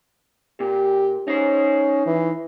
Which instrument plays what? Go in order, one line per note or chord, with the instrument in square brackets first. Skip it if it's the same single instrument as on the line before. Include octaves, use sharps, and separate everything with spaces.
[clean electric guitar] A#2 [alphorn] G4
[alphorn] C#4 [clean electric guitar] D#4 C5
[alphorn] E3